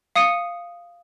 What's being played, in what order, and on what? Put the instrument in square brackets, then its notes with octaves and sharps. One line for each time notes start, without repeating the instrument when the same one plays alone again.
[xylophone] F5 D#6 C#7 D#7